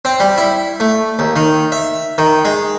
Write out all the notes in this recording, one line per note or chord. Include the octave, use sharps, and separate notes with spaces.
C4
G3
E4
A3
D#2
D#3
E5
D#3
G#3